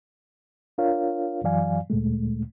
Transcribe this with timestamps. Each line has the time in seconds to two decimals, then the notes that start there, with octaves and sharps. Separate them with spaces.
0.78 D4 F4 A#4 C#5 F5
1.43 F#2 E3 F#3 D5 F5 G#5
1.90 D2 A#2 G#3 A3